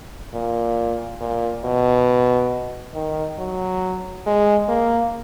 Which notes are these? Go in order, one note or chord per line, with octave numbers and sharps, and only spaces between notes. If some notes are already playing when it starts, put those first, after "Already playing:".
A#2
A#2
B2
D#3
F#3
G#3
A#3